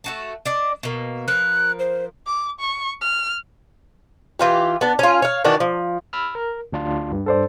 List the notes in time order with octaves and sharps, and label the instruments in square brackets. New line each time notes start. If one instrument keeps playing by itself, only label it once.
[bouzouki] A3 F#4 A5
D4 D5 D#5
B2 A#3
[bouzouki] F3 A#4 B4 [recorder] F#6
[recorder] C5
[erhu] D6
C#6
F6
[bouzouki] E3 F4 G4
B3 D4
C#4 F4
C#5 F5
D#3 E3 D4 F#4
F3
[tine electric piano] B5 E6 F6
A#4
D2 D4 F4
G2
[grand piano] A4 C5 D5